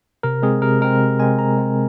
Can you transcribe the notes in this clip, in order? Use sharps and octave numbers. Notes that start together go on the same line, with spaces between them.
C3 A#4
G#3 C4 G#4
C3 A#4
G#3 C4 A#4
C3
G#3 C4 G#5
C3 A#5
G#3 C4